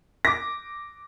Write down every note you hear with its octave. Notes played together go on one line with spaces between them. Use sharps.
D6 A#6